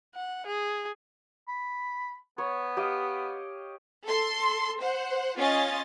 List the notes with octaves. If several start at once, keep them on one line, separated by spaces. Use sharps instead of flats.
F#5
G#4
B5
B3 C#5
G4 D#5 F5
A4 C6
C5 F#5
C#4 F4 D#5 A6